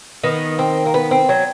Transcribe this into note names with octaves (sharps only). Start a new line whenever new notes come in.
D#3 B3
C4
A#3
B3
C4
F#3